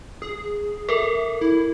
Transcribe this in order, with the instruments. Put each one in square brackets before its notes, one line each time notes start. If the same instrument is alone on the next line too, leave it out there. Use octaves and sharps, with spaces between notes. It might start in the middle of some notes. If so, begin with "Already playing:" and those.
[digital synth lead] G#4
[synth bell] A4 A#4 [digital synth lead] E5
[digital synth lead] E4